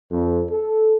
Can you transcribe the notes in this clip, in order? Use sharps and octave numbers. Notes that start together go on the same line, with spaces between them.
F2
A4